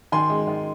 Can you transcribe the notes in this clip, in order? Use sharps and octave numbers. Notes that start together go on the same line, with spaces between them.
D#3 G#5 C6
G#3
D#3